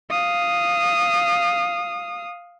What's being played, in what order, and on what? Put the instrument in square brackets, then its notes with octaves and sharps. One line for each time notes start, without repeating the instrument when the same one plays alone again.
[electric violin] F5 D#6